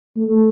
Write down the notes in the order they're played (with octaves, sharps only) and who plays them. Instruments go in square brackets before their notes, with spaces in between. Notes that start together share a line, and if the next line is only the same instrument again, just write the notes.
[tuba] A3